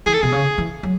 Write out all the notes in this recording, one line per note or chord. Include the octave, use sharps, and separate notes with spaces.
E3 G#4
A4
B2 G#4
C#3
E3
F#3